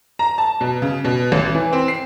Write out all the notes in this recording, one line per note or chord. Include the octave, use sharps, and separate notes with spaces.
A#5
A5
B2
C#3
B2
A1
E3
C4
C7